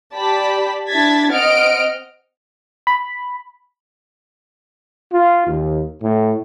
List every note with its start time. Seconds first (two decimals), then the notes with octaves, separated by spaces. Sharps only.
0.14 G4 D5 A5 B5 B6
0.89 D4 E4 A5 G#6 A6 B6
1.32 C4 D#5 F#5 F6 D7
2.87 B5
5.13 F4
5.47 D#2
6.02 A2